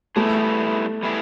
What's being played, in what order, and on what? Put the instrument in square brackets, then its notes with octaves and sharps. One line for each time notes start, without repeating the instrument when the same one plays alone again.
[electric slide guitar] G3 B3 E4 G#4 [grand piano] A3
[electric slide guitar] G3 B3 E4 G#4